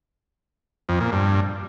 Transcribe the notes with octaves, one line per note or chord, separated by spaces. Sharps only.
F2
A#2
G2